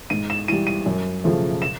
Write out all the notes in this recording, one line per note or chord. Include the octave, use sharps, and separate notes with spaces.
G#2 D#7
E7
E3 G3 D#7
D#7
F#2
C#3 F3 A3
E7